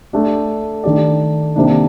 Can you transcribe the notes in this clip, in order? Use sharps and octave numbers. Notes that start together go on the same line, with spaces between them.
A3 D4 G4
D#3 A3 D4 G4 D5
C3 D#3 A#3 D4